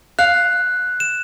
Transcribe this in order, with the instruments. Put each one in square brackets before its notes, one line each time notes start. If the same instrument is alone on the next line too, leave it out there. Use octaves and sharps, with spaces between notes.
[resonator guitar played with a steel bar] F5 [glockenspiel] F#6
[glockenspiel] E7